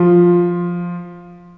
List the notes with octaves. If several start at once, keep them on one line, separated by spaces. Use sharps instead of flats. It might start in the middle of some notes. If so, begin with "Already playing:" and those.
Already playing: F3 F4